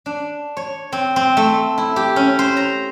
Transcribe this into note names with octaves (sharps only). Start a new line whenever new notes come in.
D4
C#5
C4
C4
A3
E4
G4
C#4
C5
A#5